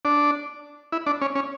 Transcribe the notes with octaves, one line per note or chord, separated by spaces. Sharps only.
D4
E4
D4
C#4
C#4